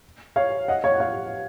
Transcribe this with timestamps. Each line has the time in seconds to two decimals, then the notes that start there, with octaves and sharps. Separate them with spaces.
0.36 C#5 F5
0.68 D#5 F#5
0.84 C#5 F5
0.94 F#5
1.00 C#5 F5